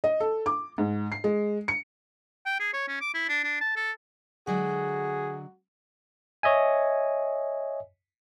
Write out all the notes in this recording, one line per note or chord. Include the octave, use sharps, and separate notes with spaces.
D#5
A4
D6
G#2
C7
G#3
C#7
G5
G#4
C#5
C#4
D6
E4
D4
D4
A5
A4
D3 F#3 G#3 F#4 G#4
C#5 D#5 E5 G#5